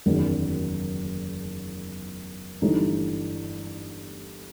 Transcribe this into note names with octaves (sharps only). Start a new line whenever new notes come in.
F#1 E2 D#3 F#3
G1 G2 E3 A3 D#4